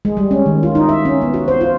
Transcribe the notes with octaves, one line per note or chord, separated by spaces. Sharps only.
G#3
G3
C#4
D#3
F4
D#4
E5
C#4
B3
F#4
C5
F4